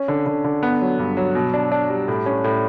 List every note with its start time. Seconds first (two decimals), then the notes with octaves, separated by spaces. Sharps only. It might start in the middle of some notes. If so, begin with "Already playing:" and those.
Already playing: C#4
0.08 D3
0.26 D3
0.44 D3
0.63 B3
0.81 F#3
0.99 G2
1.17 F#3
1.35 B2
1.54 D4
1.72 D4
1.90 G3
2.08 A2
2.26 C#4
2.44 A2